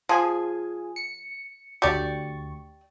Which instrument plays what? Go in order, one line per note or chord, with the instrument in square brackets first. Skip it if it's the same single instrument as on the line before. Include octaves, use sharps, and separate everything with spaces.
[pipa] F3 [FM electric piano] F4 G#4 G#5
[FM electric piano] C#7
[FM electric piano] D2 C#6 [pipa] G4 D5